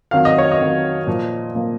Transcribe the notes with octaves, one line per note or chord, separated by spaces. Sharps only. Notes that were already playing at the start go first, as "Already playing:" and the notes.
F2 D#3 F#3 F5
D#5
C#5
D#5
F2 D#3 F#3
A#2 F3 A#3
A#2 F3 A#3